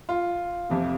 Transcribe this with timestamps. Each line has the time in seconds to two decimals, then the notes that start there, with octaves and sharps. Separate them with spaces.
0.09 F4
0.70 F1 F2 C3